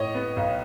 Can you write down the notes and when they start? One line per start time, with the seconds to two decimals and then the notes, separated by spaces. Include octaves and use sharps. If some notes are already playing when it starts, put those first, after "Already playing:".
Already playing: A2 C#5 D#5
0.14 B3
0.36 B1